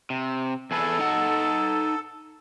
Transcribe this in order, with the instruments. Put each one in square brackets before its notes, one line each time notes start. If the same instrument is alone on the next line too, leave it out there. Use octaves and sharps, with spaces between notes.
[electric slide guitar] C3
[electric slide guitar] E2 G#4 B4 [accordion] A4
[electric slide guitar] D#4 F#5